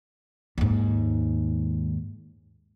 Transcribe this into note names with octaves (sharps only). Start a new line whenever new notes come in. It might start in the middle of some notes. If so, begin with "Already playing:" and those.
D#2 G#2